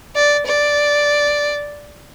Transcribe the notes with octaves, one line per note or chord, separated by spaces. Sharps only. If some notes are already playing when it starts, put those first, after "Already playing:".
D5
D5